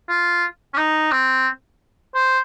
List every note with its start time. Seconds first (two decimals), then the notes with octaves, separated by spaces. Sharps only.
0.09 F4
0.74 C#4
0.78 D#4
1.12 C4
2.15 C5